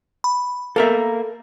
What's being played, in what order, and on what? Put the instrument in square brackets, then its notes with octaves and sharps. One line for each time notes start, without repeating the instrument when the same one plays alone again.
[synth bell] B5
[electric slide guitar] A#3 [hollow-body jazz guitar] A4 A#4 E5